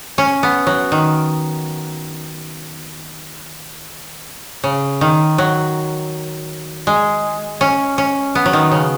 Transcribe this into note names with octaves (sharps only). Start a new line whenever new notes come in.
C#4
B3
F#3
D#3
C#3
D#3
F#3
G#3
C#4
C#4
B3
F#3
D#3
C#3